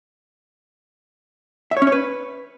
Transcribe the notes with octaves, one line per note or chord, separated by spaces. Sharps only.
E5
C#5
C#4
C#5
B4